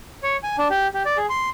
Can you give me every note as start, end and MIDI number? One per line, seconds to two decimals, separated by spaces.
0.23 0.37 73
0.43 0.56 80
0.58 0.68 62
0.70 0.88 67
0.94 1.03 67
1.06 1.17 74
1.17 1.26 68
1.29 1.50 84